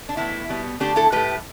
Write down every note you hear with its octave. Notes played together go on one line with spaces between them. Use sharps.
D4
A2 E3 B3 E4
B2 G3 B3
D3 A3 D4 G4
E4 A4
A2 A3 G4 B4